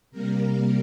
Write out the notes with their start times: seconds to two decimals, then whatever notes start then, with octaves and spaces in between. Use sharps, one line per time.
0.11 C3 G3 A#3 A#4